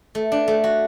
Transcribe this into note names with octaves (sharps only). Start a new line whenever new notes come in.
A3
D4
A3
F#4